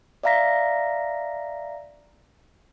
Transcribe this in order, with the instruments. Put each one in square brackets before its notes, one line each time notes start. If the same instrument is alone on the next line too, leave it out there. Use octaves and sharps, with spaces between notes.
[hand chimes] D5 E5 F5 A#5 A#6 B6